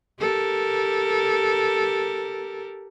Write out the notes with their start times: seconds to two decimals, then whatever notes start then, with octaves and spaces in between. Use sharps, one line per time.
0.19 G4 A4 A#4